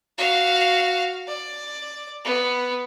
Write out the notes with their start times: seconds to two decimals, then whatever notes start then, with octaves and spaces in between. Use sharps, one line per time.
0.18 F#4 F5
1.28 D5
2.25 B3